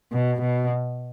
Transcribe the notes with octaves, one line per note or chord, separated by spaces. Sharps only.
B2
B2